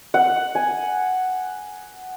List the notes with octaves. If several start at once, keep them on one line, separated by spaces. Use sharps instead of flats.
F#5
G#5